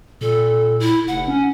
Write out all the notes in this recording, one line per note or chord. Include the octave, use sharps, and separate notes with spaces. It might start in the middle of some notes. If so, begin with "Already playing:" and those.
A#2 A4
E4
F1 F#5
C#4